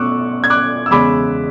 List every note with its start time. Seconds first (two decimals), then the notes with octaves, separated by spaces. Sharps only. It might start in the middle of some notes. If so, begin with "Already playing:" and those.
Already playing: B2 A3 C#4 C#6 D6 E6 F#6
0.44 G#6
0.50 D6 F#6
0.86 E6
0.91 E2 C#3 G#3 C#4 B5 D6